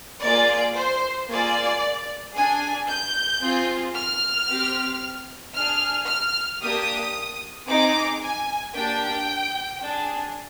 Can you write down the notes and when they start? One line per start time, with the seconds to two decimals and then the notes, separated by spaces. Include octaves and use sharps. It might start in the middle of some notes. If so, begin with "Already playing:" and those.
0.21 A#3 F4 G#4 D5
0.75 C5
1.28 A#3 F4 G#4 D5
2.34 D4 G#4 G#5
2.88 G6
3.41 C4 F4 G#4
3.94 F6
4.48 C4 G4
5.54 D4 G#4 F6
6.07 F6
6.61 A#3 D4 G4 D#6
7.67 C4 D#4 G#4 D6
8.21 G#5
8.73 A#3 D4 G4 G5
9.80 D4 G#4